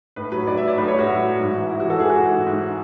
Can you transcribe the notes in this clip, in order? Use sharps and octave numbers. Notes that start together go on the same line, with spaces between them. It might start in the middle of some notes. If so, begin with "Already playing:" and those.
A2 B4
F#3 B4
A2 D5
E5
F#3
D5
A2 B4
C#5
F#3 F#4
A2
F#3
G#2
E3
E3 E4
F#4
E3
A4
E3 G#4
F#4
E3 G#4
G#2
G#2